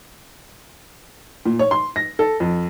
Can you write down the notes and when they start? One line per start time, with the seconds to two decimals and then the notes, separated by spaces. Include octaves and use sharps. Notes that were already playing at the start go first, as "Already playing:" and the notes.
1.46 A#2
1.59 C#5
1.71 C6
1.96 A#6
2.19 A4
2.40 F2